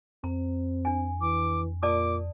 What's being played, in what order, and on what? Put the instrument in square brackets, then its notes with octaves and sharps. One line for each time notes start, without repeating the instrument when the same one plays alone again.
[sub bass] F2 [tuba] C4 [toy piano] A#5
[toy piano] D4 G#5
[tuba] E3 [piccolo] D6
[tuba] A#2 [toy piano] D5 A5 D#6 [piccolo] D6